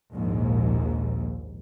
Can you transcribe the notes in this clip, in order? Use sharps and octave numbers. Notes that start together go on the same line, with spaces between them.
A#1 D#2 G#2